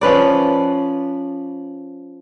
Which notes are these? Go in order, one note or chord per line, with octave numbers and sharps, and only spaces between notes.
F3 C#4 B4 D5